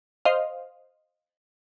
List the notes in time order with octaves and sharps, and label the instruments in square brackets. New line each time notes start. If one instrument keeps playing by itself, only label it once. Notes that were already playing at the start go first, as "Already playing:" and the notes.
[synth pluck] C5 D#5 F5